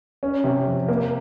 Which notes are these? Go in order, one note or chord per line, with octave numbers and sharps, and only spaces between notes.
C#4
C3
F2
A#3